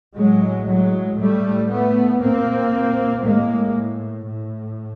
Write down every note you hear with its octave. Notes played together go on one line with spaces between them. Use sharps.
A2 F#3 G#3
F#3 G#3
A2 G3 A3
A3 B3
A#2 A#3 C4
A2 G#3 A#3
A2